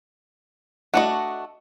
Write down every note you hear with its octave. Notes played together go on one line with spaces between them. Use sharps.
A3 D4 F#4 D#5 F#5